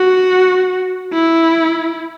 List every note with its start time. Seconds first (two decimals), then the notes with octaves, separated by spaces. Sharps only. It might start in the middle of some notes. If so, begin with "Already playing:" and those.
Already playing: F#4
1.13 E4